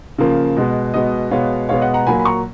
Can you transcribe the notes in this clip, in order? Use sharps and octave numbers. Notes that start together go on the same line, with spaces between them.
C#3 F3 A#3
B2 G#3 B3
B2 G#3 B3 D#5
B2 G#3 B3 C#5 F5
B2 G#3 B3 C#5 F5
D#5 F#5
F#5 A#5
A#2 F#3 A#3 G#5 B5
B5
A#5 C#6